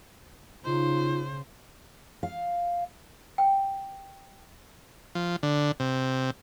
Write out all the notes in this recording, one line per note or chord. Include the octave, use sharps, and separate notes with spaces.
C#3 D#4 F4 C5
F5
G5
F3
D3
C3